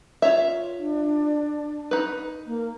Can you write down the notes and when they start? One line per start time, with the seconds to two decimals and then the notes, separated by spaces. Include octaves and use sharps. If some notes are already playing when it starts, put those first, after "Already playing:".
0.22 F4 C#5 E5
0.78 D4
1.91 D#4 B4
2.47 A#3